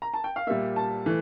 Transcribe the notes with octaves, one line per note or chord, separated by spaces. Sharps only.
A#5
A5
G5
F5
A#2 G3 A#3 E5
A5
E3 A3